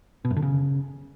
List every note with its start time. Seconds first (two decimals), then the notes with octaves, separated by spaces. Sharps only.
0.25 B2
0.31 F#2
0.36 D3
0.42 C#3